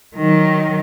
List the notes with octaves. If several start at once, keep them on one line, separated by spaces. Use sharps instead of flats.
D#3 F#3